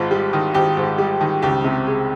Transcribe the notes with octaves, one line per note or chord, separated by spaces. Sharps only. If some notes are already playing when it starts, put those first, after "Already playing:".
Already playing: G#1 G#2 F4
G3
D#3
G#1 G4
G#2
G3
D#3
C#2 G4
C3
G#3